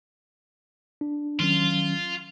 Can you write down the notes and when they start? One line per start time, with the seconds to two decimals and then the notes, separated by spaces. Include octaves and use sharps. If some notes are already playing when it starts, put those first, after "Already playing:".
1.01 D4
1.40 D#3 F#3 C#4 F4